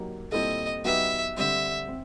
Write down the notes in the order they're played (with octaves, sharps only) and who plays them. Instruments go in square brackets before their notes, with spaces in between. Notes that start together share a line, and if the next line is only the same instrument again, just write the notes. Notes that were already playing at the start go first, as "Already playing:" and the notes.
Already playing: [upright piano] F#3 A#3 D#4 G4
[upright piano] A#2 G3 C4 E4 A4 [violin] D#5
[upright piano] F#3 B3 D#4 G4 B4 [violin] E5
[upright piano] D3 G3 C4 [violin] E5
[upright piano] C4